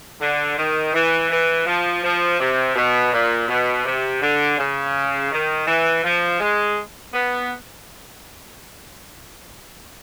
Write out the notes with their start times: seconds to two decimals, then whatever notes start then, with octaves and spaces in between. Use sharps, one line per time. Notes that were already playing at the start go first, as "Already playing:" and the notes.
0.21 D3
0.58 D#3
0.94 E3
1.30 E3
1.67 F3
2.04 F3
2.40 C3
2.75 B2
3.13 A#2
3.48 B2
3.85 C3
4.22 D3
4.59 C#3
5.32 D#3
5.67 E3
6.04 F3
6.40 G#3
7.14 B3